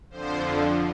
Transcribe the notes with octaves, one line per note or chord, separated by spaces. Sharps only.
F2 D3 F3 C5